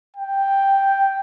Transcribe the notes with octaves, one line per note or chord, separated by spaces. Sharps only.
G5